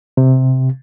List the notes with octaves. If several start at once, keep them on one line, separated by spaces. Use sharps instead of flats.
C3